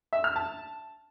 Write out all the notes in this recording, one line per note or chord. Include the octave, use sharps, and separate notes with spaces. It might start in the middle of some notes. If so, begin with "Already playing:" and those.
E5
F6
A5